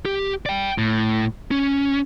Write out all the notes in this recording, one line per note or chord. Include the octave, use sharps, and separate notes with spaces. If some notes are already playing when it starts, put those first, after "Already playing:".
G4
D5 G5
A2
C#4